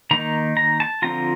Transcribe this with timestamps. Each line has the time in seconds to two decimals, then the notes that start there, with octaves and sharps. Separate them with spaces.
0.11 D#3 A#3 D#4 A#5
0.57 A#5
0.80 A5
1.02 D3 F3 C4 F4 A#5